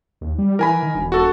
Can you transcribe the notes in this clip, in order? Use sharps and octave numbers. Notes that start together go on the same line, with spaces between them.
D#2
G3
E3 A#4 G#5 B5
D#3
E1
F#4 A4